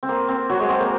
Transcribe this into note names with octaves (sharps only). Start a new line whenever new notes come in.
C4
A#3
C4
F#3 F#4
G#3 G#4
C4 C5
A#3 A#4